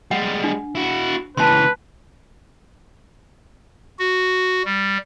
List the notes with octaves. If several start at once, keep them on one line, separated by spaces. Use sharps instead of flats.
G3 G#3 F#5
D4
E4 F#4
C#2 E3 B4 A5 C6
F#4
G3